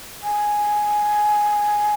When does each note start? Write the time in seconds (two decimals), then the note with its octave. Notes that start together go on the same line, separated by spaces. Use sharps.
0.23 G#5